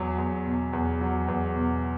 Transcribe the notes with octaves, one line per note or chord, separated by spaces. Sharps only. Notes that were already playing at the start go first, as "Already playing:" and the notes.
Already playing: E2 F#3
E2
B2
E2
F#3
E2
B2